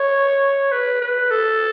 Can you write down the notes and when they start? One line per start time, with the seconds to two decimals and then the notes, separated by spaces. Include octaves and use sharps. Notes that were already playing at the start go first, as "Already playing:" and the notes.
Already playing: C#5
0.72 B4
1.01 B4
1.31 A4